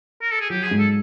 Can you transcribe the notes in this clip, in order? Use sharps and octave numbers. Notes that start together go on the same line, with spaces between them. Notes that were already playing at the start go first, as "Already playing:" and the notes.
A#4
A4
G#4
F#3 G4
G#4
G#2
A4